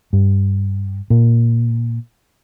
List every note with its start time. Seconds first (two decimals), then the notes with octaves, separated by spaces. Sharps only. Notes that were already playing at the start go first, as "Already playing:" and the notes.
0.13 G2
1.10 A#2